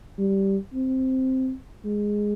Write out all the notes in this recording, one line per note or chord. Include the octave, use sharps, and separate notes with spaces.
G3
C4
G#3